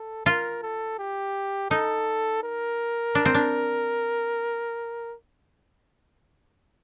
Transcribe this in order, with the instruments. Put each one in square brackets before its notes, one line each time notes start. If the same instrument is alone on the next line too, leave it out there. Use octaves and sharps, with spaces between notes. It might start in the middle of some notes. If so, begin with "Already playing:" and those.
Already playing: [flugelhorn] A4
[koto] F4 [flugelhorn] A#4
[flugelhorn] A4
G4
[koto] D#4 [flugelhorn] A4
[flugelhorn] A#4
[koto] D4
C4
D4